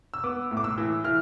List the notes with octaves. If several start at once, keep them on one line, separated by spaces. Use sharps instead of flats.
E6
B3 D6
A2
D6
E6
E3
E3 F6